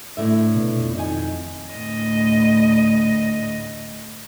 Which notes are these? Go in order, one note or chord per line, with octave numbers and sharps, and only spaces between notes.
A2 D3 E5
B2
F2
D#3 G#5
D2 A2 D#5